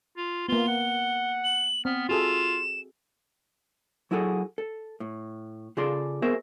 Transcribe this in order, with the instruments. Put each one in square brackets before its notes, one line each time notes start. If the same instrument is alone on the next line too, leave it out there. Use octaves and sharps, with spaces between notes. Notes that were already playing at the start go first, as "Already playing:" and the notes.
[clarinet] F4
[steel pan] A#3 B3 [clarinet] F4 [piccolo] G7
[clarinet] F#5
[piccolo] F#7
[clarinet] B3 [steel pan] C4 [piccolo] F6
[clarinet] F4 [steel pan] F#4 G#4 A4 [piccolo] E7
[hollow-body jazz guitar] F#3 E4 F#4 G#4 A4
A4
A2
C#3 F4 G#4 A4 D5 C6
B3 F#4 G#4 A#4 C5 E5